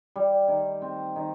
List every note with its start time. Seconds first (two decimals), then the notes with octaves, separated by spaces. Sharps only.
0.16 G3
0.48 D#3
0.82 C4
1.16 D#3